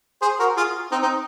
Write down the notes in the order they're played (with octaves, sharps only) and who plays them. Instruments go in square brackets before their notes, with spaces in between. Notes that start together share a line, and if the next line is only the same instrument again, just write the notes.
[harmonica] G#4 C5
F#4 A#4
F4 G#4
C4 D#4
C4 D#4